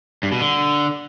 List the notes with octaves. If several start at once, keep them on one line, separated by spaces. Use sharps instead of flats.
G2
B2
D3